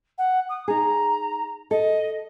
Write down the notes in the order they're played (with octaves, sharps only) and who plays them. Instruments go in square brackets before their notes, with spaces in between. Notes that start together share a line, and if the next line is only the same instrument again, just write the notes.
[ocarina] F#5
D#6
[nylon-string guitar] D#4 G#4 [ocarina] A#5
[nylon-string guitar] A4 [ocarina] D#5